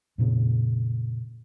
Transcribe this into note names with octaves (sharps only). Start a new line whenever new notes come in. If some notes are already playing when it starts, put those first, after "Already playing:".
F2 A#2 C#3